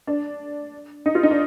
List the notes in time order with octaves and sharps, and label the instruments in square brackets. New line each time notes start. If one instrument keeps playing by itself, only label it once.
[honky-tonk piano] D4
D#4
F4
D#4
D4